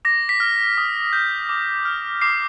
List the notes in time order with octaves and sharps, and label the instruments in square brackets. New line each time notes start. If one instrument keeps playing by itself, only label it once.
[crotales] D6 A#6
B6
F6
D#6
G6
D6
F6
D6 C7